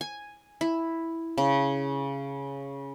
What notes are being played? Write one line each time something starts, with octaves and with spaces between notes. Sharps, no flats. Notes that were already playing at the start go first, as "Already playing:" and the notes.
G#5
E4
C#3